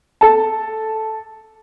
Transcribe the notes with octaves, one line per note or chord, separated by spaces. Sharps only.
A4 A5